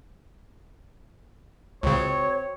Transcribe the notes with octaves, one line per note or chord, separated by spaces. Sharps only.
C#2 C#3 C4 F#4 C#5